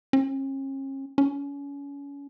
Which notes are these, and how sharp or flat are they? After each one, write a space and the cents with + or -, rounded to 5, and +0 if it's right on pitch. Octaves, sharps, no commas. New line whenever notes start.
C#4 -40
C#4 +30